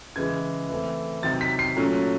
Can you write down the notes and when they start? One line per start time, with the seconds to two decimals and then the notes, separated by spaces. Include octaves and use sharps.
0.16 C#3 E3 G#3 G#6
0.69 E3 A3 C4
1.23 C3 D#3 F#3 A6
1.41 B6
1.59 C7
1.77 A#2 F#3 A3 C#4